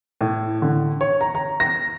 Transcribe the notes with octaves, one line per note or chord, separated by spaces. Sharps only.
A2
D3
C#5
A#5
A#5
A#6